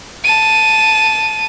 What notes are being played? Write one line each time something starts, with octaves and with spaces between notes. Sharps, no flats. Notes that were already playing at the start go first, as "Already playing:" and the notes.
A5 D#7